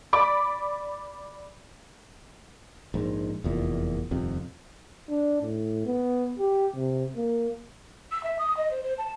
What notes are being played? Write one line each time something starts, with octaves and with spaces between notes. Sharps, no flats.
D5 B5 D6
A#1 G#2
F1 E2 A#2
D#1 F2 C3
D4
A2
B3
G4
C3
A#3
E6
E5
D#6
D#5
C5
C5
A5